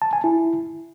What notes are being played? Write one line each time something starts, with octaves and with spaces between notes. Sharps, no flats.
A5
G#5
E4